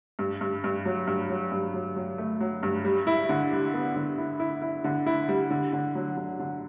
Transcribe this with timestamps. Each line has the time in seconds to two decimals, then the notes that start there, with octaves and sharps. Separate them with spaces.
0.19 G2
0.41 G2
0.64 G2
0.85 F#3
1.07 G2
1.30 F#3
1.52 G2
1.74 F#3
1.96 F#3
2.18 A3
2.40 F#3
2.63 G2
2.85 G3
3.07 E4
3.29 D3
3.51 G3
3.74 B3
3.96 D3
4.18 E4
4.40 E4
4.62 E4
4.84 D3
5.06 E4
5.29 G3
5.50 D3
5.73 D3
5.95 F#3
6.17 D3
6.39 D3